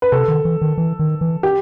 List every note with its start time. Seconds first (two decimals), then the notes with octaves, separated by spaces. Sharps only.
0.02 B4
0.12 C3 A4
0.28 D#3
0.45 E3
0.62 D#3
0.78 E3
0.99 D#3
1.21 E3
1.43 G4